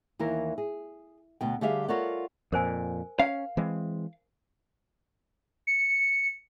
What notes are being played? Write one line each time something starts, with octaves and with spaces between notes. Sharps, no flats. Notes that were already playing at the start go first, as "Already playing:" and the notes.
D#2 E3 E4 A#4
G#4
D2 B2 G5
D3 G3 G4 G#4 E5 F5
F4 A4 A#4 C#5 D5 F#5
F2 A#2 A#4 C5 G#5
C#4 F5
E3 G#3 C4
C#7